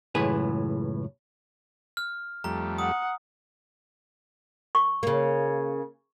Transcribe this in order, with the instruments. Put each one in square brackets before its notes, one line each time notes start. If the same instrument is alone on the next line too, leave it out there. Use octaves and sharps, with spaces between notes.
[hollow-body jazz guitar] C#2 F#2 A2 E3 G#4 B4
[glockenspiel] F6
[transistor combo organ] F2 G3 A3 [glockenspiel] A#5
[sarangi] F#5 [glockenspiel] D#6
[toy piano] C#6
[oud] C#3 A#3